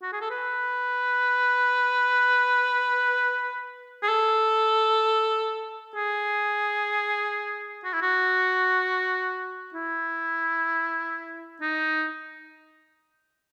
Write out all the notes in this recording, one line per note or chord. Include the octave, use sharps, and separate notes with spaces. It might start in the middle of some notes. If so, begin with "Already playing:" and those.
F#4
G#4
A4
B4
G#4
A4
G#4
F#4
E4
F#4
E4
D#4